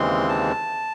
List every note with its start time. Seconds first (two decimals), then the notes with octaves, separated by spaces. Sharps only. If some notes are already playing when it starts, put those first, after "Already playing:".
Already playing: D#2 C#3 E3 G#3 C4 C6
0.29 A5